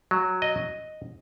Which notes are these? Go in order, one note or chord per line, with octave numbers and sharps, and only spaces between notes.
F#3
D#5